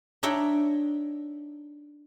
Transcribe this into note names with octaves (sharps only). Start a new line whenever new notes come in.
D4 D#4 C#5 E5 G5